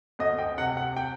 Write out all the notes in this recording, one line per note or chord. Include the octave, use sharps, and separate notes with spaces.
D2 D#5
G5
C3 F#5
F#5
G5